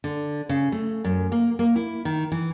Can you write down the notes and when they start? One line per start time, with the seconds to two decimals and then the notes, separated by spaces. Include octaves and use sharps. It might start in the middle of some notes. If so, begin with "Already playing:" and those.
0.04 D3
0.49 C#3
0.72 A3
1.04 F#2
1.32 A#3
1.59 A#3
1.76 E4
2.05 D#3
2.32 E3